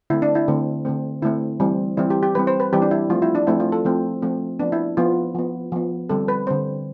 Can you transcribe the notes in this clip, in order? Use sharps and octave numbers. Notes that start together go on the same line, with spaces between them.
D3 A3 C4 E4
D4
E4
D3 A3 C4
D3 A3 C4
D3 A3 C4 E4
E3 G3 C4
E3 G3 C4 E4
G4
G4
E3 G3 C4 B4
C5
B4
E3 G3 C4 G4
D4
E4
F3 A3 C4 F4
E4
D4
F3 A3 C4 E4
F4
A4
F3 A3 C4
F3 A3 C4
F3 B3 D4
E4
F3 B3 F4
F3 B3
F3 B3
D3 G3 C4 A4
B4
D3 G3 C4 C5